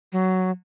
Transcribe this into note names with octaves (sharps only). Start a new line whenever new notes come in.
F#3